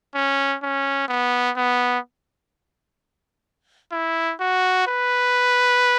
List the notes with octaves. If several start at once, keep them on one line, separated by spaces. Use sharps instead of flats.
C#4
C#4
B3
B3
E4
F#4
B4